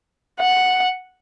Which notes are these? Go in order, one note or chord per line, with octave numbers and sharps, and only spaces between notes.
F#5